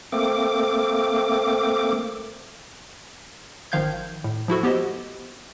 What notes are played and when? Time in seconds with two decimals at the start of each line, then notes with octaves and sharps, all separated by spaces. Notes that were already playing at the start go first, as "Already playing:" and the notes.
0.12 A3 A#3 C4 D6
3.72 G#1 D#3 F3 F5 G6 G#6
4.24 A2
4.48 F3 E4 F#4 A4
4.63 B3 G4 C5 D#5